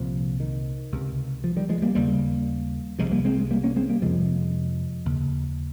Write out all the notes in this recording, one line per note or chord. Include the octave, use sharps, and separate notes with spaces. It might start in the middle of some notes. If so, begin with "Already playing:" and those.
Already playing: C2 A#2 F3
D#3
C#2 C3
F3
D#3 G3
F3 G#3
G3 A#3
D#2 C#3 G3 A#3
C2 C3 F3 G#3
G3 A#3
G#3 C4
G#3
G3 A#3
A#3 C#4
G#3 C4
G3 A#3
F2 C3 F3 G#3
D#2 C#3